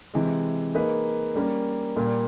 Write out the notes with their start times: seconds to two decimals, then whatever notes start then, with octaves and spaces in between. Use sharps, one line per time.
0.14 C3 E3 G#3
0.75 A#3 D#4 G#4 B4
1.35 G3 A#3 C#4
1.96 A#2 G3 A#3